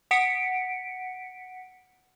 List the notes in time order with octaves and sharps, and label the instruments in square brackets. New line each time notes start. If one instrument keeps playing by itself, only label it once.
[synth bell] F#5 B6 C#7 D7